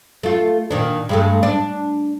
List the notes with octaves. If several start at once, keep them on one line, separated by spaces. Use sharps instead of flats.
A3 F4
A#2 D#3 D4
G2 G#3 A3
D4